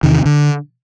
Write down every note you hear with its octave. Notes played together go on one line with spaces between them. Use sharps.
E2 C3 D#3
D3